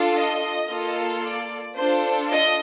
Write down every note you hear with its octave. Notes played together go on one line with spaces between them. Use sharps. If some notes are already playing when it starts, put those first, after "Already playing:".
Already playing: D4 F4 A4
D#5
A#3 F4 A4
D5
D4 F4 A4 C5
D#5